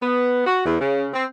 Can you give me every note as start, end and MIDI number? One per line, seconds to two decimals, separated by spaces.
0.03 0.45 59
0.46 0.61 66
0.65 0.79 40
0.81 1.07 49
1.14 1.25 60